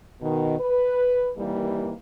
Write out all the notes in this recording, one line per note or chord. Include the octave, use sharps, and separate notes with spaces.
B2 D#3
B4
C3 D#3 E3 G3 A#3